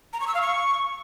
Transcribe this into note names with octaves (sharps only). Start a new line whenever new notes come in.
A#5
C#6
E6
F5
C#6